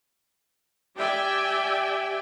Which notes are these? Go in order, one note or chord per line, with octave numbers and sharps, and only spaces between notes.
G4 D5 E5 G5 G#5